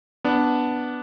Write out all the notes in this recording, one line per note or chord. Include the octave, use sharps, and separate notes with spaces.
B3 D4